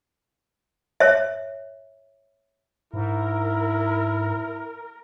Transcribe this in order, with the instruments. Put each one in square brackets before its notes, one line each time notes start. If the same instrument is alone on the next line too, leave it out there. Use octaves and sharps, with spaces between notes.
[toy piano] C#5 E5
[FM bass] G#2 [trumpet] E4 [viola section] A#4